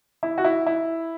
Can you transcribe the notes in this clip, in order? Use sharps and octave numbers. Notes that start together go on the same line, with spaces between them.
E4
F#4
E4
E4